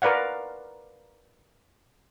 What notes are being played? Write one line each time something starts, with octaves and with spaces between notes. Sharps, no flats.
A#4 B4 D5 F5 F#5